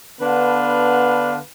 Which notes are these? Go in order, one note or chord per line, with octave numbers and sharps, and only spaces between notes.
D3 B3 D4 B4 F5